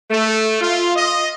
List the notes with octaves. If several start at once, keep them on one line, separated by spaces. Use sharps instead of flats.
A3
F4
D#5